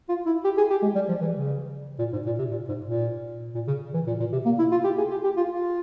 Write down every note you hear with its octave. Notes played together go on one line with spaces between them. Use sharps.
F4
E4
G4
G#4
G4
G#3
G3
F3
E3
C#3
A#2
G#2
A#2
C3
A#2
G#2
A#2
A#2
C#3
E3
A#2
A#2
C3
A#3
E4
F4
G4
G#4
G4
G4
F4
F4